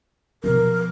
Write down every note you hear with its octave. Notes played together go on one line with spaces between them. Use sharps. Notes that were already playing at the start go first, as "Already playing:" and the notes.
B2 F3 A#4